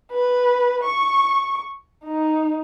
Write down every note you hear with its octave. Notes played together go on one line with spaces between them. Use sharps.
B4
C#6
D#4